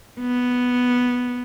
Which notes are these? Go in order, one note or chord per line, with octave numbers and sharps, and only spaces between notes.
B3